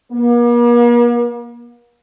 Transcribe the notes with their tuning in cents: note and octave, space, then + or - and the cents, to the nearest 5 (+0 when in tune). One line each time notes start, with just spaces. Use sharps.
A#3 +45